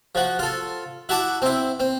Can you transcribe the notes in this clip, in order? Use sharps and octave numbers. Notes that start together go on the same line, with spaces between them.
F3 F#4
F4 A4
E4 F#4 A5 D6
C4 E4
C4